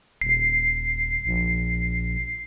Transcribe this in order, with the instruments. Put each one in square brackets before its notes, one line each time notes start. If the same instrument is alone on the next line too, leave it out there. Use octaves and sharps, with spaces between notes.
[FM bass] D#1 [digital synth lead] C7
[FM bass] A#1